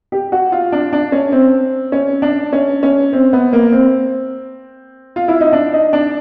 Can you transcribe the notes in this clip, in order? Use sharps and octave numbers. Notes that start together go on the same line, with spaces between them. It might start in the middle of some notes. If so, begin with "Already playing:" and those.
G4
F#4
F4
D4
D4
C#4
C4
C#4
D4
C#4
C#4
C4
B3
A#3
C4
F4
E4
D#4
D4
D#4
D4